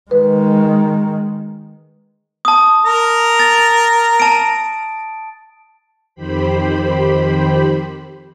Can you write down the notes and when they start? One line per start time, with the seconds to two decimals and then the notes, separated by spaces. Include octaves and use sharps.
0.11 D#3 G#3 B4
2.45 A5 D#6
2.86 A#4 A#5
3.39 A6
4.20 A5 D7
6.15 F2 D#3 G4 C5 B5